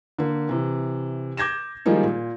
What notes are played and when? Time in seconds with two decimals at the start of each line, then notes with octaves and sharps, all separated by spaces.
0.19 D3 A#3
0.49 C3 E3
1.37 D6 G6 G#6 A#6 E7
1.86 D#3 F3 G3 G#3 A#3 D#4
2.04 A#2